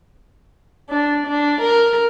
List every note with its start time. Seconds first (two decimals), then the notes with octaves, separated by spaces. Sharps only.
0.89 D4
1.26 D4
1.61 A#4